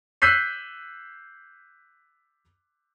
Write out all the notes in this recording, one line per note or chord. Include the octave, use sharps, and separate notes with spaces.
E6 F#6 G6 B6 C7 D#7